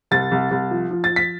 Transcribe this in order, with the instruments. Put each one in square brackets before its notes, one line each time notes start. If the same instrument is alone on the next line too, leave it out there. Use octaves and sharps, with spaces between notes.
[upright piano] C2 A6
C2
C2
F3
F3
A6
F3
B6